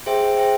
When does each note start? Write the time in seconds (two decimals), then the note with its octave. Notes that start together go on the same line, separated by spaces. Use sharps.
0.06 G#4 C5 E5 G5
0.37 G#4 C5 E5 G5